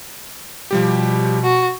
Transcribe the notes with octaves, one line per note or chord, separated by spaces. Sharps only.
B2 F3 G3 G4
F#4